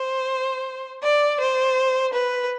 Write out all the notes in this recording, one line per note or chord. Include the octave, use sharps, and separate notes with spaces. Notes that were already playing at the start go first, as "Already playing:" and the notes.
Already playing: C5
D5
C5
B4